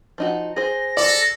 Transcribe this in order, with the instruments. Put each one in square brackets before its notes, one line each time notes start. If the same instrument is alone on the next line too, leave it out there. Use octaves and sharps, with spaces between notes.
[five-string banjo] F3 D#4 F#4
[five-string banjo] G#4 C5 [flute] A#6
[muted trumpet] A4 [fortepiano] D5